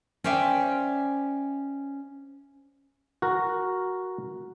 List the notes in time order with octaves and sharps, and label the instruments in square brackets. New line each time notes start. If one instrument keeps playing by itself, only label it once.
[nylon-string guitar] C#4 C5 D5 E5 G5
[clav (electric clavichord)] F#4 A#4